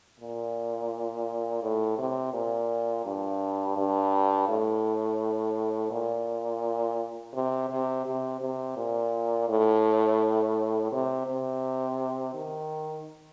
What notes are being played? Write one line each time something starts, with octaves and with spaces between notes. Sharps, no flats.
A#2
A2
C3
A#2
G2
G2
A2
A#2
C3
C3
C3
C3
A#2
A2
C3
C3
D#3